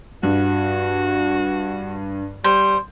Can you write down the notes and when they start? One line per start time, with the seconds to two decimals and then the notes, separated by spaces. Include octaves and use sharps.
0.23 G2 F#4
2.44 G3 C5